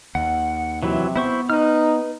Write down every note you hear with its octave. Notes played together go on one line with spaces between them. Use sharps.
D#2 F#5
C3 E3 F#3 E4
B3 E4 C5 C#6
D#4 B4 F6